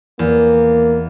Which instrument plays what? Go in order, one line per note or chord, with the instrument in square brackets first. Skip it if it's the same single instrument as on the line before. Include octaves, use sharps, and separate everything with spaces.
[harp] E2 [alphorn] A#3